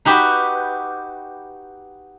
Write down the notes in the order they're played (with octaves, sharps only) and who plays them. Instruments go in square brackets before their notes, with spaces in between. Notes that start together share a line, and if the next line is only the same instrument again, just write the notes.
[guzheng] D#4 F#4 G4 B4